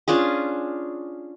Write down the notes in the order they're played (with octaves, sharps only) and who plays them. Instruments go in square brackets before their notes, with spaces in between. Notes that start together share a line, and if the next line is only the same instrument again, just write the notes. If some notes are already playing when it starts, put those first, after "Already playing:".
[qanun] C#4 D4 F4 G#4